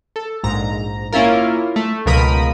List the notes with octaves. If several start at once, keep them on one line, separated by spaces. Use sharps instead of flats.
A4
A#1 G#2 A#5
A#3 C#4 E4 F4 A#4
A3
C#2 B2 F3 A#4 B5 D#6